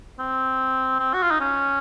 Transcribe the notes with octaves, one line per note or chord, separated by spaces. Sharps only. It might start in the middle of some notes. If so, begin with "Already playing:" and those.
C4
C4
F#4
F4
D#4
C#4